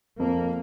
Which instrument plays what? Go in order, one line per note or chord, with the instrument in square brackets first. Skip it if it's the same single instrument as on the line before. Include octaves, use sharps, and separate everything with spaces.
[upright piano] F2 [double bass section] A#3